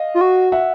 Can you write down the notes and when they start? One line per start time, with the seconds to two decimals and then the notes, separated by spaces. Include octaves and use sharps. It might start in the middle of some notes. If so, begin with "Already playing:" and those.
Already playing: D#5 F5
0.14 F4
0.21 F#4
0.52 E5 F#5